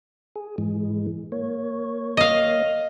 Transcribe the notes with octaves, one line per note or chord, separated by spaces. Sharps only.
G#4
G#2 E3 G#3
A#3 C#5
D#5 F5